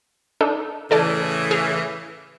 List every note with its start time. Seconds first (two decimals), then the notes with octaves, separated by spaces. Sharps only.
0.41 D4 D#4 A4
0.91 A2 C#3 E3 A4 D5 A5
1.51 G#4 F6